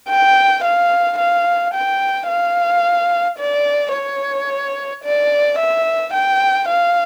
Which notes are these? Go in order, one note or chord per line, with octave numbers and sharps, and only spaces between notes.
G5
F5
F5
G5
F5
D5
C#5
D5
E5
G5
F5